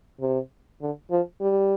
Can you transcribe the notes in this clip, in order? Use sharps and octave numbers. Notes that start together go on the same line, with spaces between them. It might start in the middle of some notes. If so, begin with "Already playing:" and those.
C3
D3
F3
G3